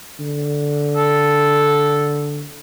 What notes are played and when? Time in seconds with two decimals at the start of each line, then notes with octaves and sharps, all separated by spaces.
0.20 D3
0.97 A4